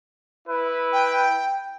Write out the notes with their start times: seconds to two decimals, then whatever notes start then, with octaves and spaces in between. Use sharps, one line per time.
0.48 E4 B4
0.93 G5